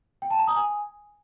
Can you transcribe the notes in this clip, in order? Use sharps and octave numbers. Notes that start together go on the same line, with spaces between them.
G5
A5
A#5
D#6
G#5